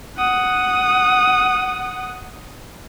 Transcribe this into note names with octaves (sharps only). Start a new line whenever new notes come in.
F#5 D#6